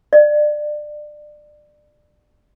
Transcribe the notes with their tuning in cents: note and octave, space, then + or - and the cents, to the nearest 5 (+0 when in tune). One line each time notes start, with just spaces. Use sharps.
D5 +25